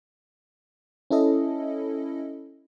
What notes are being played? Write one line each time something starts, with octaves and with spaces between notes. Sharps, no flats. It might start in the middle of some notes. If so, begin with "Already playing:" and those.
C#4 E4 A4 D#5